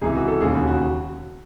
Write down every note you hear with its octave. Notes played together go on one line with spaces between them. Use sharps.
C#2 C3 E3 G#4
F#4
A4
E1 D#2 C#3 G#4
F#4
F#4